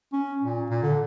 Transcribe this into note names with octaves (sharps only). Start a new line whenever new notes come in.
C#4
A#2
A#2
D3